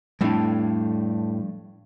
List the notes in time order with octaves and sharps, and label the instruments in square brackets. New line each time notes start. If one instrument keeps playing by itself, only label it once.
[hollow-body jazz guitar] F2 A2 [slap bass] G3 D4